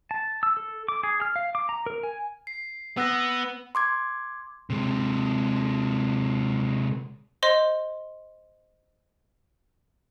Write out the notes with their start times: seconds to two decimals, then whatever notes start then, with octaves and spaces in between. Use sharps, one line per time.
0.11 A5
0.43 E6
0.57 A4
0.88 D6
1.03 G#4
1.22 F6
1.36 F5
1.55 D6
1.69 A#5
1.86 A#4
2.03 G#5
2.47 C7
2.97 B3 E6 F#6 A#6
3.75 C6 D6 G#6
4.70 C3 G#3
7.43 C5 D#5 C6